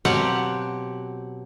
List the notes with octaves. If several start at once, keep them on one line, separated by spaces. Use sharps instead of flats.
B2 F#3 C4 G4 F5 F#5